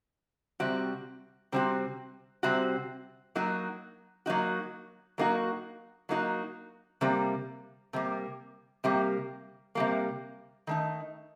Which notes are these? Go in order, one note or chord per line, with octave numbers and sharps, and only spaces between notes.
C3 G3 C4 F#4
C3 G3 C4 F#4
C3 G3 C4 F#4
F#3 A#3 D#4 F#4
F#3 A#3 D#4 F#4
F#3 A#3 D#4 F#4
F#3 A#3 D#4 F#4
C3 G3 A#3
C3 G3 A#3
C3 G3 A#3
C3 G3 A#3
D#3 A3 D#4